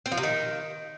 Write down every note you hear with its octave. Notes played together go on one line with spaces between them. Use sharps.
C4
F3
C3
D#3